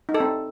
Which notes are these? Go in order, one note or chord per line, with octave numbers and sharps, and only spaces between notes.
D#4
A4
C4